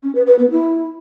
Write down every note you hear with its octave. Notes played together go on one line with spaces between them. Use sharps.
C#4
B4
B4
B3
E4